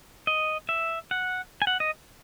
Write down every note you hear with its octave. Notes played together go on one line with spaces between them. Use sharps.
D#5
E5
F#5
G#5
F#5
D#5